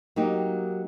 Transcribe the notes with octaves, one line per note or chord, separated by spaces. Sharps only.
F#3 A#3 D#4 G4